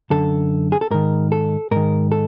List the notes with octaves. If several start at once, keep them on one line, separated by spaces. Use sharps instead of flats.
F#2 D3 A4
G#4
A4
G#2 D#3 A#4
A4
G#2 D#3 A#4
A4